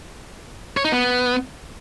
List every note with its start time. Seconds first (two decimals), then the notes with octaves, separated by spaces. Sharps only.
0.77 C#5
0.85 D#4
0.92 B3